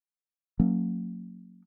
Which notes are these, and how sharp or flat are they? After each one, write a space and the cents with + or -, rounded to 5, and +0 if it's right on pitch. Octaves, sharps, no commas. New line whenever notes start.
F#3 -30 A#3 -35 C#4 -20